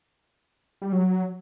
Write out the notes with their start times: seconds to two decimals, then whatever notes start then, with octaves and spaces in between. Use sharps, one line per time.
0.82 G3
0.92 F#3